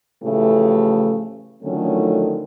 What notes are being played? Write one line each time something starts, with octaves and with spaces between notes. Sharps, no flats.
A2 C#3 E3 F3 A3 G4
D3 D#3 F3 F#3 A3 C#4